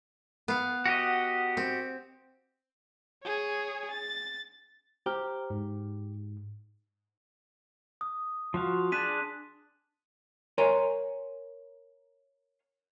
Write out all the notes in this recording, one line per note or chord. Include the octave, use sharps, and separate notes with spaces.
B3 F5
F#4 G4 D#5
C4
G#4 C#5
A6
G4 C5 A#5 F6
G#2
D#6
F3 F#4 F5 C6
D4 G#4 A5 F#6 B6 D#7
A#4 C#5 G#5 C6